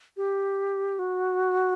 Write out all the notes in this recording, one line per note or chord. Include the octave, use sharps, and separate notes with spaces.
G4
F#4